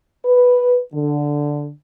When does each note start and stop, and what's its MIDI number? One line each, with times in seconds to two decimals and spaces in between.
0.24 0.79 71
0.93 1.70 50